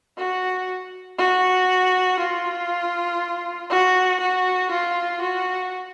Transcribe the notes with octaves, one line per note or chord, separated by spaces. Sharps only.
F#4
F#4
F4
F#4
F#4
F4
F#4